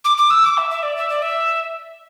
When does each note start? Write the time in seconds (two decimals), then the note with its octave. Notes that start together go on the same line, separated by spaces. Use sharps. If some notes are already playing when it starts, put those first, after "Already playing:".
0.05 D6
0.18 D6
0.30 E6
0.44 D6
0.58 E5
0.71 E5
0.83 D5
0.97 E5
1.10 D5
1.22 E5